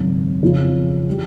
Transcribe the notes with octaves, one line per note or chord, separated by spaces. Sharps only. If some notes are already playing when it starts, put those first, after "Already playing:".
Already playing: G#1 F#2 C#3
F2 C#3 F3
E3 G3